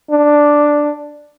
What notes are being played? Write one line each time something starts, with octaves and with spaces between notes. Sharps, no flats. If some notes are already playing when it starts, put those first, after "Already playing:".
D4